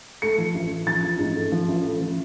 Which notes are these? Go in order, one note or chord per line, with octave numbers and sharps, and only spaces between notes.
A3 C#7
F3
A1
A1
F3 A6
A1
G#2
A3
F3
A1
A3
F3